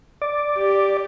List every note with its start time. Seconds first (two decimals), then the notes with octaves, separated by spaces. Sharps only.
0.22 D5
0.58 G4